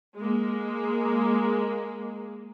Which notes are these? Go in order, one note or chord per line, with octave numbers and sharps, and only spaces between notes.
G#3 A#3